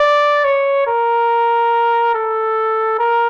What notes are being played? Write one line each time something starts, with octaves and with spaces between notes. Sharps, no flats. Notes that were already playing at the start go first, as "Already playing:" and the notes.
Already playing: D5
C#5
A#4
A4
A#4